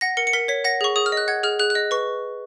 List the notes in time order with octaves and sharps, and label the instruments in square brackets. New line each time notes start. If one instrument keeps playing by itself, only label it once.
[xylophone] F#5 A#6
A#4 C#7
C#7
A#4 B6
C#5 B6
F#5 A#6
G#4 C#6
G#4 D#6
F6
D#5
F#6
F#5 G#6
G#4 F6
G#4 F#6
F#6
D#5
B4 C#6